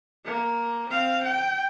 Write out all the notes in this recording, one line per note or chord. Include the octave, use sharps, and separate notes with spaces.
A#3
C4 F5
G5